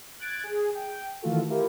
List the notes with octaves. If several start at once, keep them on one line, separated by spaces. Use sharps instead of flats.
F#6 G#6 A6 D7
G#4
G5
D#3 E3 A3 F4 F#4 A4
E4 F4 G4 A#4